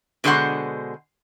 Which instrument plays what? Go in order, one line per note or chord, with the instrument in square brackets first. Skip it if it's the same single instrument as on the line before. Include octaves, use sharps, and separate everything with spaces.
[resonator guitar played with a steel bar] B2 D3 G#3 A#3 C5 F#5